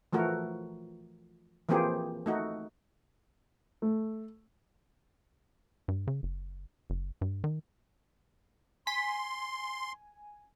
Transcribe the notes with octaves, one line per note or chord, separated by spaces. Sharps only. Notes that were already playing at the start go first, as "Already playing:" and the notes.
E3 F3 A3 F#4 A#4
E3 F3 A#3 C4 G4 G#4
A3 D#4 F#4
A3
G2
C#3
F#1
F#1
G2
D#3
G#5 C6 B6